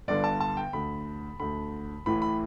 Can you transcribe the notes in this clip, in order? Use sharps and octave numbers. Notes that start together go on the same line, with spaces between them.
G1 G2 D3 D5
A5
A5
G5
D2 D3 B5
D2 D3 B5
A1 A2 E3 B5
B5